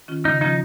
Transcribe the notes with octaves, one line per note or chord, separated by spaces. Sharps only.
D#3 C#4 F4
C#3 D#4
F3 C#4 D#4 F4